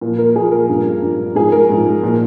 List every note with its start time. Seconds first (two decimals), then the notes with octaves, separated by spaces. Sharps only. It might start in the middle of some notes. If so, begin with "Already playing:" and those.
0.01 A#2 F3
0.18 A#4
0.36 A#2 F3 G#4
0.51 A#4
0.69 G2 F3
1.02 G2 F3
1.35 G#2 F3 G#4
1.52 A#4
1.69 G#2 F3
2.03 A#2 F3